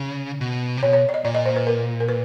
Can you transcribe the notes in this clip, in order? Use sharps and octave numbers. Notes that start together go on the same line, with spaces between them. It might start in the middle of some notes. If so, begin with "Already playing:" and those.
Already playing: C#3
B2
C3
B2 C#5
C#5
D5
D#5
A#2 D5
D#5
C5
B4
A#4
A#4
B4